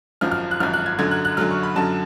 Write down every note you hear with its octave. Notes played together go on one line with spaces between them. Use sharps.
G#1 F#2 F3 F6
F6
F#6
G#1 F#2 F3 F6
F#6
G#6
F#2 D3 F#3 G#6
F#6
F#6
F#2 D3 F#3 F6
C#6
B5
F#2 D3 F#3 A5